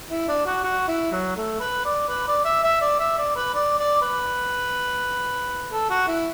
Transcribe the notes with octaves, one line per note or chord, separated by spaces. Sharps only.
E4
D4
F#4
F#4
E4
F#3
A3
B4
D5
B4
D5
E5
E5
D5
E5
D5
B4
D5
D5
B4
A4
F#4
E4